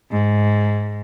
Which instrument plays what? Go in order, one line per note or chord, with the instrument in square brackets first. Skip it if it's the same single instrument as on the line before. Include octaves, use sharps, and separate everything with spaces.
[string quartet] G#2